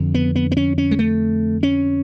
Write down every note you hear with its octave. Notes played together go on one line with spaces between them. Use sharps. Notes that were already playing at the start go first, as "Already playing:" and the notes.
Already playing: F2 D3
B3
B3
B3
C#4
C#4
G#3
A3
C#4